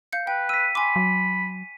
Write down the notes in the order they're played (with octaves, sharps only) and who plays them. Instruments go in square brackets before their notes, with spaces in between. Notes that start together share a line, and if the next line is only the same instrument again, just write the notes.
[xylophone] F5 G6 C#7
[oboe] B4 [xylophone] G5
[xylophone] E6 [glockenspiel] B6 D#7
[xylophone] G#5 C6 D6 [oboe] B5
[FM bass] F#3